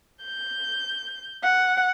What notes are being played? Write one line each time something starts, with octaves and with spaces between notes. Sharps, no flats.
G6
F#5